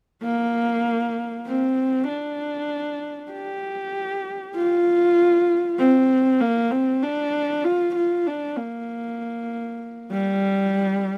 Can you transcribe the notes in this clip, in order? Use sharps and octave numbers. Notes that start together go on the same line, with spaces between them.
A#3
C4
D4
G4
F4
C4
A#3
C4
D4
F4
F4
D4
A#3
G3